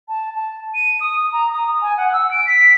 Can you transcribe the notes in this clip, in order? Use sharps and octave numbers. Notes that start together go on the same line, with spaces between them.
A5
A5
D#7
D#6
A#5
D#6
G#5
F#5
E6
D7
B6